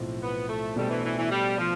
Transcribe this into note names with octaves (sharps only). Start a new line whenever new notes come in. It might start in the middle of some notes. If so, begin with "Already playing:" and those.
Already playing: B1 A2 F3 C4
B3
A3
B2 G3 A3 D4 A4 C5
E3
E3
E3
G3
F3